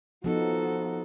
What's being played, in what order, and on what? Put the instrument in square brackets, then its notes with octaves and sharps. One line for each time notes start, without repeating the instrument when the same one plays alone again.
[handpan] F3 B3 D#4 [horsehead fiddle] F#4 A4